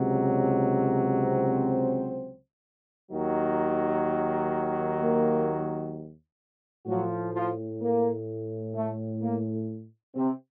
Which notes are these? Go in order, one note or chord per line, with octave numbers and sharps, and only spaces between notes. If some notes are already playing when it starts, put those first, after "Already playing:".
Already playing: C#2 C3 F#3
C4 C5
D#2 D#3 F#3
A#3 A#4
A2 F3 F#3 F#4
F3 F4
A#3
A3
A#3
C3 C4